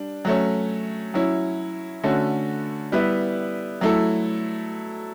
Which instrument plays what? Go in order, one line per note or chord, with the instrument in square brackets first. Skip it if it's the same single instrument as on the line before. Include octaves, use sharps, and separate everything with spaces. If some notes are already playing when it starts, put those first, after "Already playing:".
Already playing: [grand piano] G3 D4
F#3 A3 C#4
F#3 C#4 E4
D3 A3 C#4 F#4 A4
G3 B3 E4 B4 E5
F#3 A3 E4 A4